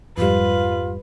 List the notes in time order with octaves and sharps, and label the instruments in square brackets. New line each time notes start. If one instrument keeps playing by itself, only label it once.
[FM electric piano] F2 G#2 G3 [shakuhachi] F4 [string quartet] B4